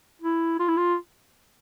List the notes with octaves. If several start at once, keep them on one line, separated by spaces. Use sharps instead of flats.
E4
F4
E4
F4